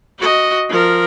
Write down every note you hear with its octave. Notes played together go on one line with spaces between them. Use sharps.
F#4 D#5
F3 A#4